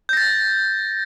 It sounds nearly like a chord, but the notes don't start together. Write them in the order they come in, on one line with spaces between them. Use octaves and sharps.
G6 A#6 A6